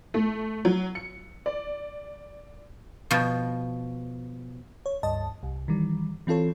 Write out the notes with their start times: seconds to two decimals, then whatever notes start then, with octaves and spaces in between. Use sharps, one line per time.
0.14 A3
0.65 F#3
0.95 C#7
1.46 D5
3.11 B2 F3
4.86 C#5
5.03 C#2 G2 D#5 A5
5.43 C2
5.68 D#3 E3 G3
6.27 E3 C4 F4 A4 C#5